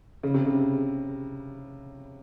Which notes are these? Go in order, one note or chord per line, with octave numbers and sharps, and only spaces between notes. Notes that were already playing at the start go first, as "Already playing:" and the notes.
C#3
C3
C#3